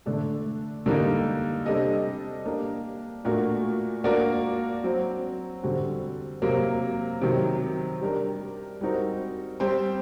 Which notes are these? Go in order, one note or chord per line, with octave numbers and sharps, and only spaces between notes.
D3 A3 D4 A4
D3 G3 A#3 D#4
C3 G3 D4 A4 D#5
A#3 D4 G4
A#2 A3 D4 F#4 A#4
A#3 D4 F#4 A#4 D5
F#3 C4 F#4
D3 G3 C4 F#4
C3 F#3 A#3
C3 D#3 F#3
G3 D4 G4 A#4 D5
G3 C4 D#4 F#4 A#4
G3 C4 G4 C5